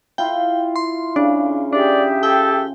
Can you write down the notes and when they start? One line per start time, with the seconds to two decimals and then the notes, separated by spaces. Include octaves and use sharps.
0.18 E4 F4 G5
0.76 C6
1.16 C#3 D4
1.73 D4 G4 G#4 D5 E5
2.23 A4 G5